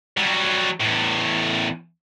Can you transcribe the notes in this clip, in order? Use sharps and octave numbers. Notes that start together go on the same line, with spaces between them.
F#3 G3
E2 A2